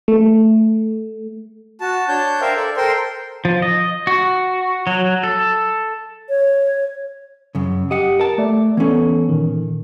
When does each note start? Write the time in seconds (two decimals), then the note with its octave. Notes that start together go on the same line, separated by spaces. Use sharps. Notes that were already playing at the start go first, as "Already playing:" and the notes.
0.08 A3
1.80 F#4 A5
2.08 D4 C#5 A5 G6
2.41 A#4 C5 E5 F5 G5
2.56 A4 D5
2.77 A4 A#4 C5 G5 C6
3.45 F3
3.62 D#5
4.07 F#4
4.87 F#3
5.24 A4
6.29 C#5
7.55 F#2 C#3
7.91 G4 D#5 F#5
8.19 A#4 A5
8.38 A3 D5 E5
8.77 E3 B3 C#4 A4
9.29 A#2 D#3